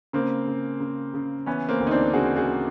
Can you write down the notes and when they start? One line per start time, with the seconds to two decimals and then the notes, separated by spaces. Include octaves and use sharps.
0.13 C#3 A#3 C4
0.47 C#3
0.80 C#3
1.14 C#3
1.46 E3 B3 C#4
1.69 A#3 C4
1.80 D2
1.87 D#4
1.91 C4 D4
2.14 C#3 F#4 G#4
2.36 F#4 G#4